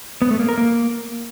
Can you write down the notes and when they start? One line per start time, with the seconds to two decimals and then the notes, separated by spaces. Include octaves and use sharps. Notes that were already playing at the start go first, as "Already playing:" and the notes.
0.22 B3
0.31 A3
0.40 A#3
0.49 A#4
0.58 A#3